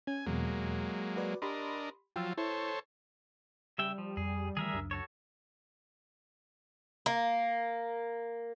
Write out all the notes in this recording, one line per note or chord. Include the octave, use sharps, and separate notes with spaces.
C#4 G#5
E2 B2 F#3 G#3 A#3
F#4 B4 D5
D4 G4 A#4 D#5 B5 C6
F3 F#3 F4 G5 E6 A6
E4 A4 C5 C#5
C#3 G3 E5 G5
F3
F2 G#4
D#3 E3 A3 G#4 A#4 E5
C#2 F#2 D4
F#4 A4 C#5
A#3